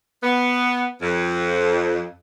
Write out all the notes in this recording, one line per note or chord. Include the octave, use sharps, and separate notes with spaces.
B3
F2